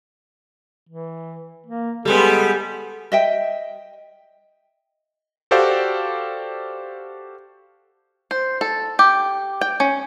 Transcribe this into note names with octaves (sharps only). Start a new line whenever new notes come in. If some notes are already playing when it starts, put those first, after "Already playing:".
E3
A#3
G3 G#3 B3 A4
D#5 E5 G5
F#4 G4 A4 C5 D5 F5
C5
A4
G4
G5
C#4